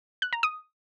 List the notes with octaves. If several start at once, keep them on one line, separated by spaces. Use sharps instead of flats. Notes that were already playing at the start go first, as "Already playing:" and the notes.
F#6
A#5
D#6